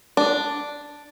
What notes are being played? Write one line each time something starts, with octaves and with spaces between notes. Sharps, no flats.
D4